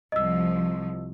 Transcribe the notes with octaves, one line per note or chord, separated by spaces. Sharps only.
C2 F3 D#5 E6